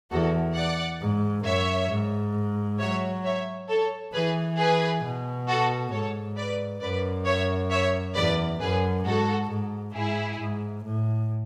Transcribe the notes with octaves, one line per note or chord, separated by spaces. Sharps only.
E2 F#4 A4
D5 F#5
G#2
F#2 C#5 E5
G#2
F#3 C#5 E5
C#5 E5
A4 C#5
E3 G#4 B4
G#4 B4
B2
F#4 A4
G#2 A4 C#5
B4 D5
F#2 B4 D5
C#5 E5
C#5 E5
E2 B4 D5
F#2 G#4 B4
G#2 F#4 A4
G#2
G#2 E4 G#4
G#2
A2